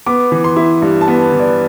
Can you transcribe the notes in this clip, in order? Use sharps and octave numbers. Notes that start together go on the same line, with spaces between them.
B3 D6
E3
C6
E4
G2
A5
B3
E3
D5